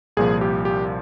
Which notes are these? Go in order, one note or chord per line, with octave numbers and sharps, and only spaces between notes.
C2 A#2 F3 G#4
G4
G4